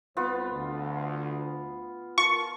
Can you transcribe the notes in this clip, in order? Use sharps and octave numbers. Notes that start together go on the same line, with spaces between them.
C2 B3 F4 B4 C5
D2
F4 A#4 A5 C#6